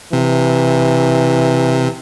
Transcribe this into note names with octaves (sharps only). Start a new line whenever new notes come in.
C3 E3